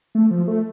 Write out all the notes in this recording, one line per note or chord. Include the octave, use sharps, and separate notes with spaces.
A3
F3
A3